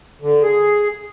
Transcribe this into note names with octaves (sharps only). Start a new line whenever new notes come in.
D3
G#4